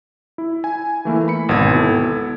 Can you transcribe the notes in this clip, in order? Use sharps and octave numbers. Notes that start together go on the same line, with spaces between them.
E4
G#5
E3 A3 A#3 E4
B5 C#7
G#1 D2 B2 G#6
B3 E4 A4